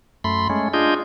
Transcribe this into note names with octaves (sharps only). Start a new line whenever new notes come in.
F#2 A3 B5 C6
G#3 A3 C#4
D4 F4 G#4 D#5 G6